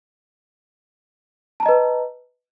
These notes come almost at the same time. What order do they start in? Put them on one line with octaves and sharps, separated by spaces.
A5 A#5 D#5 B4